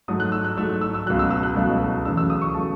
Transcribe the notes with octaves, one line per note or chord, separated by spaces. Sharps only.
G#2 F#3 A3 D#6
F#6
E6
F#6
G#2 F#3 A3 E6
E6
E6
C#2 B2 F#3 A3 F#6
E6
E6
F#6
C#2 B2 F#3 A3
E2 C#3 F#3 A3 E6
E6
D#6
C#6
C#3 F#3 A3 A5